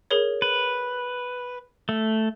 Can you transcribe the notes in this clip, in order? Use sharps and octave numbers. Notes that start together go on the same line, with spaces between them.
G#4 A#4 C#5
B4
A3